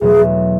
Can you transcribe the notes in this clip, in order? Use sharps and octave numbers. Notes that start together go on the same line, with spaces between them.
E2 B2 F#3 A3 G#4